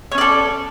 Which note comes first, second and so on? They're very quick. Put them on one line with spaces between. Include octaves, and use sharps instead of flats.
C#5 C#4 D5 A4